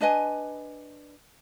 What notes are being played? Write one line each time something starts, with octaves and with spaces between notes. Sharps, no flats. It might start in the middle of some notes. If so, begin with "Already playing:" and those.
D4 B4 D#5 G#5